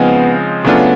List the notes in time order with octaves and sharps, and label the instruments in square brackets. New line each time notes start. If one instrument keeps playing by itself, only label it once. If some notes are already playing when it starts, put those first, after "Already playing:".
Already playing: [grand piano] C#3 F3 G#3 C4 D#4 [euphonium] B3
[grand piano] C#3 F#3 A3 D4 F4 [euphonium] B3